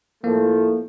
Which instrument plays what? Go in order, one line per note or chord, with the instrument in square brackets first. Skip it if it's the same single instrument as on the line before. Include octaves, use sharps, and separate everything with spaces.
[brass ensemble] A2 F3 A3 [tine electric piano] A#3